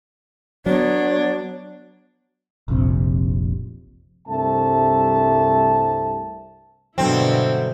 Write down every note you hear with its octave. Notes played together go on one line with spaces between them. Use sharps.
F#3 B3 D4 C#5
F1 A#1 C3
C2 G2 C3 A3 E5 A5
G2 B2 D3 E3 F#3 C4 E4